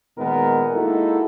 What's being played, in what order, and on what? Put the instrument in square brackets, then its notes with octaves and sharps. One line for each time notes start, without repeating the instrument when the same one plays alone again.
[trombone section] A#2 D#3 G#3 B3 A#4
G#3 A#3 D#4 E4 F#4 A4